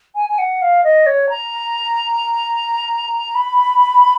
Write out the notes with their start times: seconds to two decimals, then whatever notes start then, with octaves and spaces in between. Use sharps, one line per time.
0.15 G#5
0.29 G#5
0.38 F#5
0.62 F5
0.84 D#5
1.06 C#5
1.29 A#5
3.35 B5